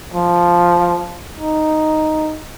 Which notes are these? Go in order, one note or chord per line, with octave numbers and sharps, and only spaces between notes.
F3
D#4